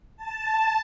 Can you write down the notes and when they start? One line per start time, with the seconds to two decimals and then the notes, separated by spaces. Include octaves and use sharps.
0.17 A5